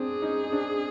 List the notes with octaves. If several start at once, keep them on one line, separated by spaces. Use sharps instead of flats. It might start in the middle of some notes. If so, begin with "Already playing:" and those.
Already playing: C4 D4 G#4
C#4 D#4
C4 D4